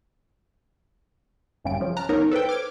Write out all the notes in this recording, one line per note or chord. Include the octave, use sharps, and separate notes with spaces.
G#1 F#2 C#3 G3 D7
C#3 F3
A5 A#5 F6 F#6
G1 C#2 B3 D#4 A#4 C#5
A4 B4 C5 G5
D6 F6 G#6 D7